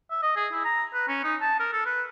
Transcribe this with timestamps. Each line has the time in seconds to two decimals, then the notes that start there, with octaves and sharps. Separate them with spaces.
0.11 E5
0.23 D#5
0.36 G#4
0.52 E4
0.65 A#5
0.94 B4
1.08 C#4
1.24 D#4
1.41 A5
1.60 A#4
1.73 A4
1.86 B4